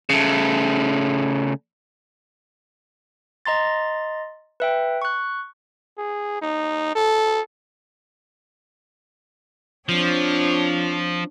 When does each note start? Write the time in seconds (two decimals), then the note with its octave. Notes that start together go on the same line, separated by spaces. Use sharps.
0.10 C#3 A3
3.46 D#5 A#5 C6 A6
4.60 B4 E5 G5
5.02 C#6 F#6
5.98 G#4
6.42 D#4
6.95 A4
9.89 F3 C4 D4 C#5